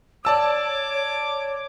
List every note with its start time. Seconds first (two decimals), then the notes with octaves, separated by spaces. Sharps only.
0.25 C#5 D5 A5 D6 E6